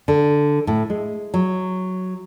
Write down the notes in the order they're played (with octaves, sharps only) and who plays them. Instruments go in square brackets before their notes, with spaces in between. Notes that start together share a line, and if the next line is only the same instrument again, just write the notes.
[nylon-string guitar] D3
A2
G#3
F#3